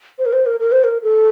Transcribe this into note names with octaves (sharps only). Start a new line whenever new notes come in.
C5
A#4
C5
A#4
A#4
C5
A#4
A4